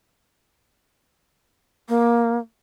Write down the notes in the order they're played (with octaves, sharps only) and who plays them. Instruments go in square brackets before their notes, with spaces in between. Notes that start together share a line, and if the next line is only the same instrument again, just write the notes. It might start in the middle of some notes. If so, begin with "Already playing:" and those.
[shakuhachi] A#3